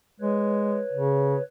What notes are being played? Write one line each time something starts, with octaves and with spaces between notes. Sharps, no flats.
G#3 B4 C#5
C#3